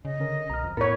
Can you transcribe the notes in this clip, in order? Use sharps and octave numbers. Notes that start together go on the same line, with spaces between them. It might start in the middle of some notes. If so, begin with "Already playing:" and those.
C#3 D#5
D3 C#4 A#4
B1 A#5 F6
F2
A2 B3 E4 A#4 C#5 B5